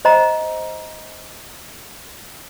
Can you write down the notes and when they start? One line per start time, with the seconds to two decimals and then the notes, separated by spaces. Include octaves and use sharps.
0.05 C5 D#5 A#5